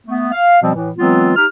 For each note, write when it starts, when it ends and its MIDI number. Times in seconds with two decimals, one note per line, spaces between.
0.07 0.27 57
0.07 0.27 59
0.32 0.57 77
0.62 0.70 47
0.62 0.70 53
0.62 0.70 55
0.62 0.70 60
0.74 0.90 45
0.74 0.90 52
0.97 1.32 52
0.97 1.32 54
0.97 1.32 56
0.97 1.32 59
0.97 1.32 60
0.97 1.32 65
1.36 1.45 63
1.36 1.45 67
1.36 1.45 89